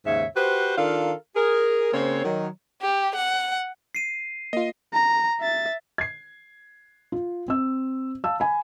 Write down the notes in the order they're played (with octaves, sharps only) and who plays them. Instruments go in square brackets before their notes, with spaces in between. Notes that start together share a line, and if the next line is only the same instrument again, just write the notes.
[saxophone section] D#2 G#2 C#3 C#5 E5
F#4 G4 B4 C5
D#3 D4 F4 A4 A#4 F5
G#4 A#4
C#3 A#3 C4 C5 C#5
D#3 F#3
[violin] G4
F#5
[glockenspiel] C7 D#7
[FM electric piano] A#3 F4 [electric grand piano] D#5
[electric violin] A#5
E5 A6
[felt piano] G#6 C7
F4
C4 E6
F5 A5 E6
G#5 B5